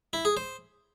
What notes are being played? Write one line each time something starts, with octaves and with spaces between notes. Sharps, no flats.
E4
G#4
C5